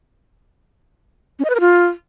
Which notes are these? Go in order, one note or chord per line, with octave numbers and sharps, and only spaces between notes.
C#4
D#5
B4
A#4
F4